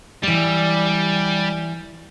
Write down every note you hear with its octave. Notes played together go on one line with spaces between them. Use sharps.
E3 G3 D5